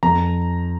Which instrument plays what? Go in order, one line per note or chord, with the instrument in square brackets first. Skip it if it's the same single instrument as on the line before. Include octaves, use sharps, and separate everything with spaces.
[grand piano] F2 A#5